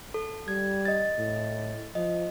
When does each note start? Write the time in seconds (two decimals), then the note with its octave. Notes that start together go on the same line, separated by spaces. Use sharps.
0.14 A4
0.48 G3 G#6
0.85 D#5 A6
1.18 A2
1.95 F3 D#5